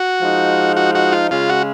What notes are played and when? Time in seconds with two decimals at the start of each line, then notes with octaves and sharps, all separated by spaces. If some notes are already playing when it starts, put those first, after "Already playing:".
Already playing: F#4
0.22 F3 G#3 D#4
0.77 F#4
0.95 F#4
1.12 F4
1.31 C#3 G#3 C#4 F4
1.49 F#4